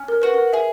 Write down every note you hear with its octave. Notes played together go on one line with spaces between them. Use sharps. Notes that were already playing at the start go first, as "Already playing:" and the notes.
Already playing: C#4
A#4
F#4 B4
A#4
G#4 E5